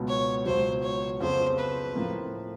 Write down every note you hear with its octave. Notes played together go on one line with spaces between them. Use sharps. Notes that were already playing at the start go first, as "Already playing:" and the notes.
Already playing: C#2 B2 F#3 B3
C#5
C#2 B2 F#3 C5
C#5
F2 C#3 F#3 B3 C5
B4
A2 F3 A#3